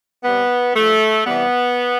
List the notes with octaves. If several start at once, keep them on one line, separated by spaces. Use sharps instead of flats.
C3 G3 B3
G2 F3 A3
C3 E3 G3 B3